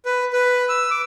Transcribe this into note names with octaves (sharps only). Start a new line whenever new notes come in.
B4
B4
E6
D6